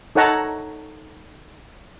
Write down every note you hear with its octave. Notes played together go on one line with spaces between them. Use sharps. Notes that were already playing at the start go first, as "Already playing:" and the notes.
D#4 A4 C#5 F#5 A5 A#5